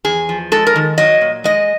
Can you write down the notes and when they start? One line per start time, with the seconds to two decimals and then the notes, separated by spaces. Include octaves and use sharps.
0.05 E2 G#4
0.29 F3
0.52 G#3 A4
0.67 A#4
0.76 D#3
0.98 F#3 D#5
1.21 A#2
1.44 G#3 D#5